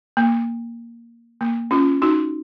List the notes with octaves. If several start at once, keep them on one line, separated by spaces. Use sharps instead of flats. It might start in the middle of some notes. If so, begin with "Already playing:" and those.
A#3
A#3
C#4 F4
D#4 F#4